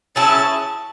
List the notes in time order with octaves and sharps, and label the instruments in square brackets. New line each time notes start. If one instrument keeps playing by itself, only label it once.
[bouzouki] F#3 C#4 E4 G#4 [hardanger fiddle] A5